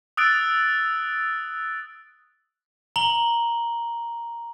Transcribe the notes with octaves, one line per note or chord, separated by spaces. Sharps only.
D#6 E6 F#6 A6 D7
A#5 F#7 G7